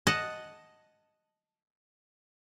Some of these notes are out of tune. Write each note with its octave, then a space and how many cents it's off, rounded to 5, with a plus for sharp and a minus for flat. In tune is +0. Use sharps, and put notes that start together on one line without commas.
D#5 +0 F#5 +0 A5 +0